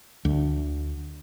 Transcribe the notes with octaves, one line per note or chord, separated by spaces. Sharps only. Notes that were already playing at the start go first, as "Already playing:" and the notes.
D2